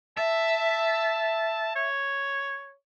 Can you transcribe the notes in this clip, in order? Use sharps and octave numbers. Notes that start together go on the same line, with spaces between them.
E5 A5
C#5